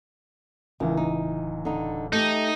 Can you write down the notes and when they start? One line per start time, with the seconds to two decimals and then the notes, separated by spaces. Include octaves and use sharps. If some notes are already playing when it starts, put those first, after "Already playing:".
0.80 D1 C#2 D#3 E3
0.97 D#4
1.65 D3 D#4
2.13 A3 D#4 G4